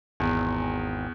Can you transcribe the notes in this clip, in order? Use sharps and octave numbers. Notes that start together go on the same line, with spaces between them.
G#1 E2